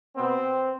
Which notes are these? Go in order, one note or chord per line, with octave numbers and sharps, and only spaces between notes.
B2 B3 C4